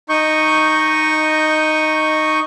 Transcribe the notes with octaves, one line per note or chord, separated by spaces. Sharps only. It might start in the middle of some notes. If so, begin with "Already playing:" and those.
D#4 D#5 C#6 G6